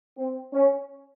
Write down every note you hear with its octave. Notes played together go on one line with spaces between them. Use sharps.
C4
C#4